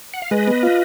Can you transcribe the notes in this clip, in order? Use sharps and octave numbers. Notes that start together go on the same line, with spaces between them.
F#5
F5
G#3 B4 D#5
B3
F4